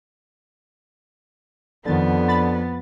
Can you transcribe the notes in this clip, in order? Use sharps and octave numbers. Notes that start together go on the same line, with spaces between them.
F2 D3 D#3 B3 A6
B5 A6